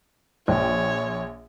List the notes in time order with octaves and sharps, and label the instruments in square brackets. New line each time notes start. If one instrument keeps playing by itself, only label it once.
[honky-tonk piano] A#1 G5 [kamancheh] C#5